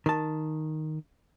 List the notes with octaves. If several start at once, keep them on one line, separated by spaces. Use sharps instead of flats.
D#3 A5